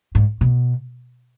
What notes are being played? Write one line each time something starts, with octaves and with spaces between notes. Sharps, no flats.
G#2
B2